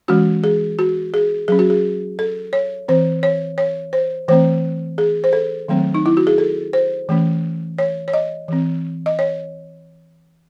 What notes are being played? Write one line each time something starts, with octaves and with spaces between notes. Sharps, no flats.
E3 G#3 C#4 F#4
G#4
F#4
G#4
F#3 C#4 G#4
F#4
G#4
A4
C#5
E3 C4 C5
C#5
C#5
C5
E3 A3 C4 C5
G#4
C5
A4
D#3 F#3 A3 C4
D#4
E4
F#4
G#4
A4
C5
E3 A3 C#4
C#5
C#5
D#5
E3 C4
D#5
C#5